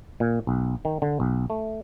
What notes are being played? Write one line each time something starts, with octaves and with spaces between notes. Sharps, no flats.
A#2
B1
D#3
D3
B1
A3